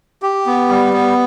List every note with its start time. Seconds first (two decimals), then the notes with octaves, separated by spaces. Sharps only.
0.22 G4
0.46 B3
0.69 G3
0.93 B3